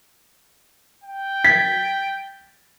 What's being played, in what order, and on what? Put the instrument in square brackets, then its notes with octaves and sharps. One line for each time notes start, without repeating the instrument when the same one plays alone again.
[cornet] G5
[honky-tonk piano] G#6 A6 B6